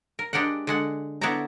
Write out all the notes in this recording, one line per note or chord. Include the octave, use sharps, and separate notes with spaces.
A#4
G#3 D4 G4 A#4 F#5
D3 G#3 F#5
D3 B3 E4 C#5 D5 A#5